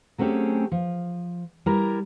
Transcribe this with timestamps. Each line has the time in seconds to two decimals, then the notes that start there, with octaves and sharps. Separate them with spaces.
0.18 F#3 A3 C4 C#4 G4 G#4
0.72 F3
1.66 G3 E4 A#4 A#5